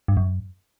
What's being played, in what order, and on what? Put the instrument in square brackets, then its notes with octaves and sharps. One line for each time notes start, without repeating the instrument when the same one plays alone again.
[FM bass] G2
F#2